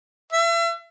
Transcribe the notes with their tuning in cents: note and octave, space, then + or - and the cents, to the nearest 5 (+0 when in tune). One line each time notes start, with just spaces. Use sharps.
E5 +35